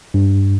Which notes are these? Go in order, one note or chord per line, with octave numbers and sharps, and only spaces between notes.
G2